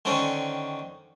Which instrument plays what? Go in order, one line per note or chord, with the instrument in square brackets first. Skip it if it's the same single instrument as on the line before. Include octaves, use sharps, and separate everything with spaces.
[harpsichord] D3 D#3 C4 C#4